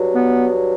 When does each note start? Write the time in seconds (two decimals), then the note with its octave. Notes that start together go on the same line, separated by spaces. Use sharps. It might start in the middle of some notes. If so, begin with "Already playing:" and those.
Already playing: G2 F#3
0.14 B3